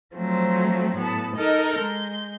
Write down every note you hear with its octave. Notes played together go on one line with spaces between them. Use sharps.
F3 F#3 A3 C4
A2 B3 A5
D#4 A4 A#4 D#5
G#3 G6